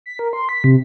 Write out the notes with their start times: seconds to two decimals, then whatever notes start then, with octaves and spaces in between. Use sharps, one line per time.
0.06 B6
0.19 A#4
0.33 C6
0.49 B6
0.64 C3